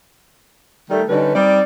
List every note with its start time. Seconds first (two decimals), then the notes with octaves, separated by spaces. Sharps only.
0.90 D#3 G3 A3
1.08 D3 G3 C#4 D#4 B4
1.34 G3 C4 D#4 D5